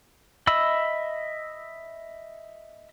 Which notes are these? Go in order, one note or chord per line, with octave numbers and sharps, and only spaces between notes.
D#5 E5 B5 E6